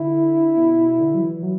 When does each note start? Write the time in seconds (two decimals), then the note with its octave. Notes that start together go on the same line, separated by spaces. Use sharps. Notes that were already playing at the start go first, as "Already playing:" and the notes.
Already playing: D3 E4
0.57 B2
0.78 B2
1.00 D3
1.14 F#3
1.21 E3
1.43 F#3